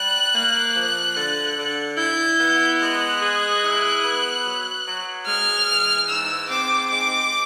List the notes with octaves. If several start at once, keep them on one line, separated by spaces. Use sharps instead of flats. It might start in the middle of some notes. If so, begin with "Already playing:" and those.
Already playing: G3 F#6
A#3
F3
D3
D3
E4 G6
B3
G#3 F#6
G#4
E4
B3
F#3
F#3
G#3 F6
E3
G#2 E6
C4 D6
G#3 D6